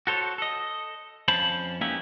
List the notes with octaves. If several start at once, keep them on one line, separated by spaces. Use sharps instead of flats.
F#4 A4 C5 C#5
A4 D#5
F2 C#4 C5 F5 A5 B5
A#3 B3 C#4 D#4 E4 G4